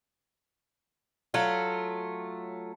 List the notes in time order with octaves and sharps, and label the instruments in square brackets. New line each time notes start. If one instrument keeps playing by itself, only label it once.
[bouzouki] F#3 A3 F4